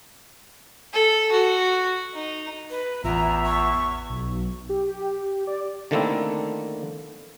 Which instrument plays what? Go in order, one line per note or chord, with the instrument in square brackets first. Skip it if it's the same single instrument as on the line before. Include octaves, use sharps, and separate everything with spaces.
[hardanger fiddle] A4
F#4
D#4
[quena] B4
[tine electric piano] A1 F4 [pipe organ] E2 E5 [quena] A#5
[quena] C#6
[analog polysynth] B1
G4
D5
[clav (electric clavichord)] D3 D#3 A3 A#3 C4 E4